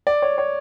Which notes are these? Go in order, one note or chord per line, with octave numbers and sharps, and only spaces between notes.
D5
C#5
C#5